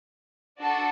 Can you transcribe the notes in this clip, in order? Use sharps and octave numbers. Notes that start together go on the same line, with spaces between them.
D4 F#4 A4